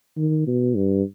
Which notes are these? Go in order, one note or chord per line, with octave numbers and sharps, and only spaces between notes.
D#3
B2
G2